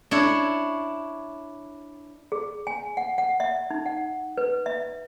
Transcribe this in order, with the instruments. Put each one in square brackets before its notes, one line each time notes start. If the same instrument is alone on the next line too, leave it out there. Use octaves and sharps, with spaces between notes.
[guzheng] D4 E4 C#5
[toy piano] G#4
G#5
F#5
F#5
E5
D#4
F#5
B4
E5